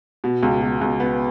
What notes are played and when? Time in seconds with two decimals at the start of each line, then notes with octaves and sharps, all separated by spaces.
0.24 B2
0.43 C#2
0.62 B2
0.81 C#2
1.00 B3